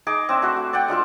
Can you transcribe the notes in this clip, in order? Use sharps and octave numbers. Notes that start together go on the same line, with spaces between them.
D#4 G#4 D#5 D6
C4 D4 E5
A3 F#4 C5
F#4
D5 F#5 G5
G#3 D4 F4 A4